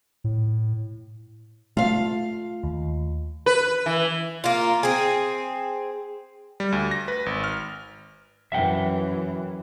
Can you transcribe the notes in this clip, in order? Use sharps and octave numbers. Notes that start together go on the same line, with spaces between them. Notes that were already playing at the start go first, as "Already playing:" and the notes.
A2
A3 F4 F5
D#2
B4
E3
A#3 F4
C4 G#4
G3
D2
A#6
B4
G#1
F6
F#2 E3 E5 F#5 G5